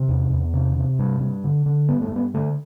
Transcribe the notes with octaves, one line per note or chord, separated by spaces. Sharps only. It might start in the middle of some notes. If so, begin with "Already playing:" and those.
Already playing: C3
E2
E2
C3
C3
G2
G2
D3
D3
G2 B3
A3
G2 B3
D3 A3